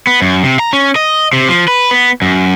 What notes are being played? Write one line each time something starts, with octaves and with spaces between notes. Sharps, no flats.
B3
F#2
C3
A#5
C#4
D#5
C3
F3
B4
B3
F#2